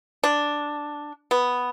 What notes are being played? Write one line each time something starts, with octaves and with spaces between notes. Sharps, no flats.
D4
B3